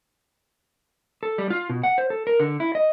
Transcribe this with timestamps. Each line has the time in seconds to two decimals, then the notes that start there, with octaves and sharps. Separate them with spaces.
1.23 A4
1.38 G3
1.50 F4
1.70 B2
1.83 F#5
1.98 C5
2.10 A4
2.27 A#4
2.40 D3
2.60 E4
2.75 D#5